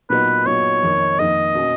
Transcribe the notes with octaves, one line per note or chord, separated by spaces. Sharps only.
A#2 F#3 B3 D#4 B4
A#2 F#3 B3 D#4 C#5
F2 D#3 A#3 D#4
F2 D#3 A#3 D#4 D#5
B2 A#3 C#4